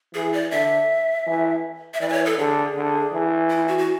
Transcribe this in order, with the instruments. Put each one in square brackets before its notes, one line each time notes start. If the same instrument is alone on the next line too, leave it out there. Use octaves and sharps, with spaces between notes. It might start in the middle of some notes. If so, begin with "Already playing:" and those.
[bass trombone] E3 [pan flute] G#4
[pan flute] D5
[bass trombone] D3 [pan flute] E5
[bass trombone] E3
[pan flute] E5
[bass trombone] E3 [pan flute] D5
[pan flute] B4
C#5
A4
[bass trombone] D3 [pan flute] G#4
[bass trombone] D3
E3
[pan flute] E4
F#4
F#4